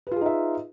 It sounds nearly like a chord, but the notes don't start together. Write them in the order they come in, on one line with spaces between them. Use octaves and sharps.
B4 F4 G#4 D#4 E5